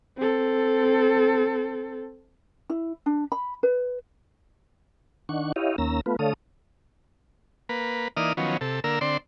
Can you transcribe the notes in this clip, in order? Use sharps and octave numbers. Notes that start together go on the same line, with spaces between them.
C4 A4
E4
D4
B5
B4
D#3 D4 F#5 C#6
E4 G4 C#5 D#5 F5
D#2 A#3 C#4 A#5 E6
A3 B3 F4 B4
D3 A3 A4 C#5 F5 D#6
A#3 B4
E3 A#3 D#4 D5 D#6 F6
D#3 F3 F#3 B3 C#4
C3 A4
D3 A#3 A#4 E6
D3 C4 D5 C6